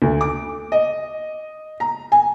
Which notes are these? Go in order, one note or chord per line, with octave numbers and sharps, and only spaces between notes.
D2
D6
D#5
A#5
G#5